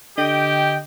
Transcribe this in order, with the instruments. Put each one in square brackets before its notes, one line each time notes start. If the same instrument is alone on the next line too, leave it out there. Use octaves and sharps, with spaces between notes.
[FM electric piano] D3 [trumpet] G4 [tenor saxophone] D#5 [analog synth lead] G5